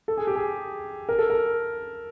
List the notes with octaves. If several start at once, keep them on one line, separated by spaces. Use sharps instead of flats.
A4
G#4
G4
G#4
A#4
A4
A#4